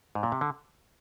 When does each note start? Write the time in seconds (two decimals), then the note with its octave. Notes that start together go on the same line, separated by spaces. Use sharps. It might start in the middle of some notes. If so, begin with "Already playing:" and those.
0.15 G#2
0.23 A#2
0.32 C3
0.41 D3